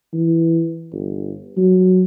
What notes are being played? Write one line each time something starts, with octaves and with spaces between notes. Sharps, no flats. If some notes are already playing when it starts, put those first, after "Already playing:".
E3
G1
F#3